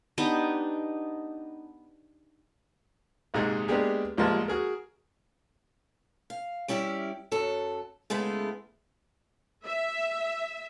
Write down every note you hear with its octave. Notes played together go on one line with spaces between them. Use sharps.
B3 D4 D#4 G4
A#1 G#2 C3 D#4 G#4
G#3 A#3 B3 D4 G4 G#4
A1 F3 G3 G#3 A#3 A5
F#4 G#4 A#4
F5
G3 C#4 E4 G4 D5
F#2 F#3 A4
C#3 G#3 A3 B3 E4
E5